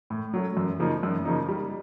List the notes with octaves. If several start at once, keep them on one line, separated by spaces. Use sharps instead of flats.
A2
F#3 A3 C#4
F#2
C#3 F3 A#3 D#4
F#2
C#3 F3 A#3 D#4
G3